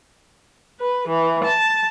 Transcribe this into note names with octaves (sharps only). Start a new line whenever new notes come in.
B4
E3
A5